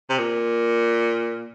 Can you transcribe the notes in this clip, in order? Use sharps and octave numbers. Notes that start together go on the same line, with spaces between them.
C3
A#2